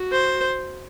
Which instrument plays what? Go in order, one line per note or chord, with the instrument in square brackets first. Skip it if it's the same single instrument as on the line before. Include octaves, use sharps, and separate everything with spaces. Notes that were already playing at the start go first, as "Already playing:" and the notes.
Already playing: [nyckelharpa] F#4
[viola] C5